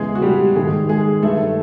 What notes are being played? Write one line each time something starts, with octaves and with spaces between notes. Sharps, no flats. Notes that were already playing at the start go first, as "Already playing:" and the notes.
Already playing: E2 C#3 E3 G#3 G#4
F#4
G3 G4
G#2 D#3 G#3 G#4
G#3 G#4
G2 D#3 A3 A4